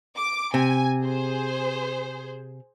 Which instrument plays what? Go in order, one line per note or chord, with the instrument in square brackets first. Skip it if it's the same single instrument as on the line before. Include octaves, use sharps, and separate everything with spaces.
[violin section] D6
[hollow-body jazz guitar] C3 [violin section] G#5
[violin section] G#4 C5